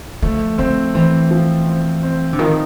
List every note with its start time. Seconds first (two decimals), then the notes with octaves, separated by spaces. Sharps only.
0.22 F3 A3
0.58 F3 C4
0.94 E3 C4
1.31 F3
1.67 C4
2.03 C4
2.33 D3
2.39 D#3 F3